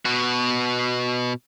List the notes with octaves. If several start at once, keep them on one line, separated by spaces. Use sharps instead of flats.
B2 F#4